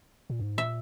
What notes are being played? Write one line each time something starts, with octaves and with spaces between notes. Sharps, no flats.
A#2
F#2
G#2
A#2 E5